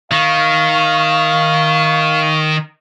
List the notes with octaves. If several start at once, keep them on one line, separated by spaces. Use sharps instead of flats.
D#3 F5 C#6